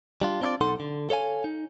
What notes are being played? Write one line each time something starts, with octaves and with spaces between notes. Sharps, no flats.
G3 D4 F4
C4 D4 E4 F4 D5
B1 D#4 A4 F#5 C6
D3
A4 C#5 F5 G#5
D#4